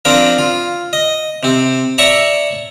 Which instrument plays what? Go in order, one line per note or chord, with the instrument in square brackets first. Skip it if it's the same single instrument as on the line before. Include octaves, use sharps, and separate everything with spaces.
[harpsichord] F3 C4 D4 F4 A#4
F4
D#5
C3 C4
C#5 D5 E5 A5 A#5 C#6